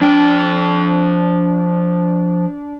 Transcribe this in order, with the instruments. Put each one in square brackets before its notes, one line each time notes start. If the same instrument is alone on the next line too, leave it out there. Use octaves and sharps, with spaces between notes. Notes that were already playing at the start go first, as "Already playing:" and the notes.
[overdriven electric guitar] F3 G5 [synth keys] D4